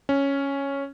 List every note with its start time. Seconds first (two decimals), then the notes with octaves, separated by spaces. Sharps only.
0.09 C#4